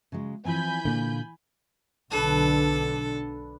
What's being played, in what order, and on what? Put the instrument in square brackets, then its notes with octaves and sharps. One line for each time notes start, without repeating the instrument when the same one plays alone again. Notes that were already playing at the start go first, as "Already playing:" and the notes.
[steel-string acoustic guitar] C#3 F#3 G#3
[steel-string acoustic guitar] E3 F3 C4 [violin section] G#5 B5 G6
[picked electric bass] A#2 D3 [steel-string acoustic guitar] A#3
[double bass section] B1 D3 [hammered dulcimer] D4 B4 [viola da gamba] A4